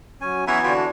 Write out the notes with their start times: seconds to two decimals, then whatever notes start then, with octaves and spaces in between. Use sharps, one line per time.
0.21 F#3 C#4 G#5
0.47 E3 B3 C#4 E5 F#5 G#5 A#5
0.64 D3 E3 F4 F#4 G5
0.77 D4